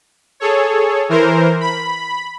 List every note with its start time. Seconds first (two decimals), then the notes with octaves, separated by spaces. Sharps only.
0.40 G#4 A4 C#5
1.09 E3 A#4 C5
1.61 B5